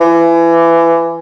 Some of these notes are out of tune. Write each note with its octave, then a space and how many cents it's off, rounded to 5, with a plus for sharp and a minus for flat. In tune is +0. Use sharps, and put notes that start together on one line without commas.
E3 +25